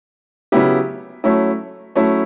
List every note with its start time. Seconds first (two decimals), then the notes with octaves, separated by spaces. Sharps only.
0.52 C#3 F#3 B3 E4 G4
1.24 F#3 A3 C#4 E4
1.95 F#3 A3 C#4 E4